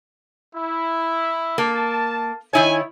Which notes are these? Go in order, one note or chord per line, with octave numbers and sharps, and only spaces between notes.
E4
A#3 A5
D#3 E4 C#5 G#5